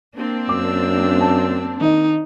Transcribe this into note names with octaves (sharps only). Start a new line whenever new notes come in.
A#3 C4 D4
F#2 D6 E6
A5
D#3 D#4 D#5